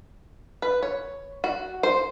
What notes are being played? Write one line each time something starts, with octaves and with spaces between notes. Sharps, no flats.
B4
C#5
F#4
C5